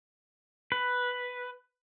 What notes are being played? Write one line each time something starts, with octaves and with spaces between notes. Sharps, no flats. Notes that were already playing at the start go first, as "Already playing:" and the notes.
B4